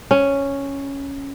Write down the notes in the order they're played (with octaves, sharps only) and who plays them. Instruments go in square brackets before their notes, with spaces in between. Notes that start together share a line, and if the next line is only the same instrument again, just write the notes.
[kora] C#4